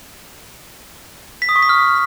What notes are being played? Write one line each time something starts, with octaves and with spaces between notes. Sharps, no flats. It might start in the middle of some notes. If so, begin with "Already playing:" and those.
B6
D#6
C#6
B6
F6